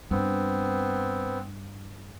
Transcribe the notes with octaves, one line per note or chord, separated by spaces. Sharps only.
G2 B3 C4